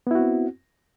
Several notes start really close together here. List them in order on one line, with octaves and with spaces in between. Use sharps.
B3 E4 F#4 C4